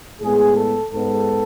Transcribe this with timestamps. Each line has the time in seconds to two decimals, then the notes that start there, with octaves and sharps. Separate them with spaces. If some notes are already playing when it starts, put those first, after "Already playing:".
0.21 A2 G#3 B3 G#4
0.56 A4
0.91 G#2 G#3 B3 A4